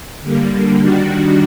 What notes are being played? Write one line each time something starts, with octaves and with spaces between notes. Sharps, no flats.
D3 G3 A#3
D#3 G3 D4 F#4